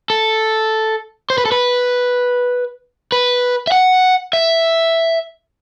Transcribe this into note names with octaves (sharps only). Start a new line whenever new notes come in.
A4
C5
B4
A4
B4
B4
E5
F#5
E5